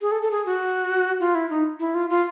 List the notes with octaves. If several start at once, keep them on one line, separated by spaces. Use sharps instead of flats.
G#4
A4
A4
G#4
F#4
F4
E4
D#4
E4
F4
F4